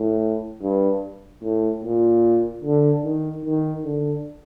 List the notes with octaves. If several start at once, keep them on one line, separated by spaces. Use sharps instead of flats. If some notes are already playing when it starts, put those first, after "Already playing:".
Already playing: A2
G2
A2
A#2
D3
D#3
D#3
D3